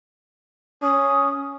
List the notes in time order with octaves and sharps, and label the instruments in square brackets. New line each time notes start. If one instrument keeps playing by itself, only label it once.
[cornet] C#4 [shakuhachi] D#6